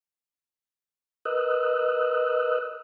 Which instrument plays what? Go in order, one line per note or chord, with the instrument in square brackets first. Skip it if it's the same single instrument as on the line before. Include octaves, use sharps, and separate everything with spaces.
[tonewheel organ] A#4 B4 D#5 D#6 E6 F#6